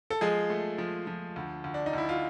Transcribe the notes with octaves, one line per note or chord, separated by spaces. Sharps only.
A4
F3 G#3 G#4
A3
F3
F3
D2
D2
D4
D#4
D2 E4
F4